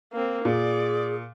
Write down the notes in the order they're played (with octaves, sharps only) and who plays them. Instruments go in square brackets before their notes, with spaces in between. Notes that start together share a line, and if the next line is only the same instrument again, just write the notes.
[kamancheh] A#3 C4
[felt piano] A#2 [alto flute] G#4 [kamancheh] D5